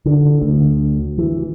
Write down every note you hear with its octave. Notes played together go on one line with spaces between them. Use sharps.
D3
D2
E3